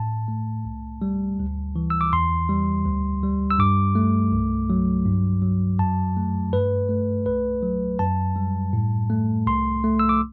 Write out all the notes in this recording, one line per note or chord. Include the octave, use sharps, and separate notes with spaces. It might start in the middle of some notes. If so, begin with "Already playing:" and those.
Already playing: A2 A5
A3
C2
G3
D2
E3
E6
D6
E2 C6
G3
D2
G3
E6
G2 D6
A3
C2
F#3
G2
F#3
F#2 A5
A3
G2 B4
A3
C2 B4
F#3
F#2 A5
G3
A2
A3
C2 C6
A3
E6
D6